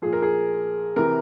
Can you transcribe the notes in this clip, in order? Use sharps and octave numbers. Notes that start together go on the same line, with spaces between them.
A#2 F3 G#4
A#4
G#4
C3 E3 A#4